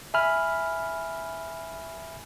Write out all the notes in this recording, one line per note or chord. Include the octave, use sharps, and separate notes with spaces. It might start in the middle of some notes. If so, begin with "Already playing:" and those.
E5 G#5 B5 F6